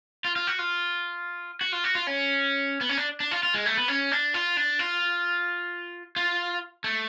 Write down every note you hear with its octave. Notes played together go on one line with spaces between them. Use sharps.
F4
F4
F#4
F4
F#4
F4
F#4
F4
C#4
B3
C#4
D4
D4
F4
F4
G#3
A3
B3
C#4
D4
F4
D4
F4
F4
A3